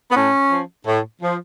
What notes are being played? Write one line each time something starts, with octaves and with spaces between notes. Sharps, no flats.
B3
A2 C#4
F3
A2
F3